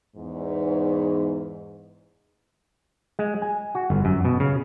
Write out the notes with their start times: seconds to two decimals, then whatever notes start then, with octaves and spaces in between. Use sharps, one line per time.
0.16 E2 G#2
3.19 G#3
3.42 G#5
3.75 F#4
3.90 G1
4.05 F#2
4.25 B2
4.40 C#3